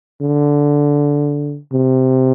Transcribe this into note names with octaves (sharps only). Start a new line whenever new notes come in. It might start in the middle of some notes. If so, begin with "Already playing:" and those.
D3
C3